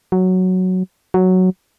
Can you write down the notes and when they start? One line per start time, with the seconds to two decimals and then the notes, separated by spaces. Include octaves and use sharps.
0.12 F#3
1.14 F#3